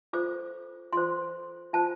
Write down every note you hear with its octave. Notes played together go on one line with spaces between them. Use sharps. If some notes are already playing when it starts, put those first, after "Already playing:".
F4 A4 C5 D6
F4 A4 C5 C6
F4 C5 A5